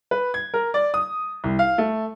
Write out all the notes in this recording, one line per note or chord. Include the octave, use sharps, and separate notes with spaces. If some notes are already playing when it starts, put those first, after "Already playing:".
B4
G#6
A#4
D5
D#6
C2
F5
A3